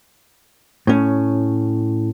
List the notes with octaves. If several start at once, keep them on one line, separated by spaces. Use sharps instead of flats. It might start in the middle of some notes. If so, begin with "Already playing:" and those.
A2 C#4